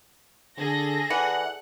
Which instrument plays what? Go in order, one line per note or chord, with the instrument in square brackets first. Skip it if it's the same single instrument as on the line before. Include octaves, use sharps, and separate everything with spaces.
[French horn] D3 [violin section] G#4 A4 A#6
[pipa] E3 [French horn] D5 [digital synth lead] F#5